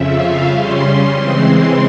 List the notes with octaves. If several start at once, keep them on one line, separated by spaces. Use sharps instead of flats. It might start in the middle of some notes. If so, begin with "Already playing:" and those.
Already playing: F2 C#3 F3 E5
F5
C#3 G3 C#4 C6
C#3 E3 G#3 C4